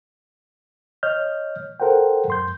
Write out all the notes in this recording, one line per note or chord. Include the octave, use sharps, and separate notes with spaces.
C#5 D#5 F6 G6
A4 A#4 C5 F#5 G5
F#2 C6 G6